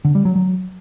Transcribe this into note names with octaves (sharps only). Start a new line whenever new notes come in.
D3
G3
F#3
F#3